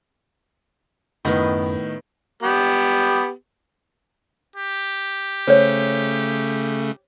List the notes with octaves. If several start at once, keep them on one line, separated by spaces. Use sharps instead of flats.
F#2 A2 D#3 B3 D#5
B3 G4
G4
C#3 A3 C5 C#5